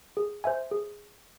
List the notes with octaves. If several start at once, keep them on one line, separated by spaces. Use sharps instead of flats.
G#4
C5 E5 G#5
G#4